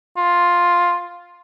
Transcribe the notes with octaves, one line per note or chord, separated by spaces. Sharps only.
F4